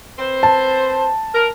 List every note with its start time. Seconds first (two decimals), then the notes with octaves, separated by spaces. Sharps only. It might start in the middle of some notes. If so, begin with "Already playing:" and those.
0.19 C4 B4 C5
0.43 A5
1.35 A#4